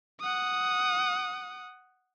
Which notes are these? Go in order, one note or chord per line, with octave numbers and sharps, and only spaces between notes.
F#5 D#6